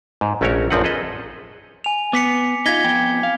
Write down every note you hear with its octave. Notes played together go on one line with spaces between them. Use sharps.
G#2
A#1 A3 C#4 F#4 A#4 C#5
A#1 F#2 F3 C4 B4 F#5
G#4 A4 B4 D#5
G#5 F7
B3 D6 B6 C#7
D#4 F4 G#6 B6 G7
F2 B3 G5
F5